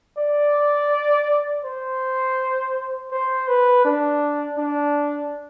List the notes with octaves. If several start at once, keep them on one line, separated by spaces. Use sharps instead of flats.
D5
C5
C5
B4
D4
D4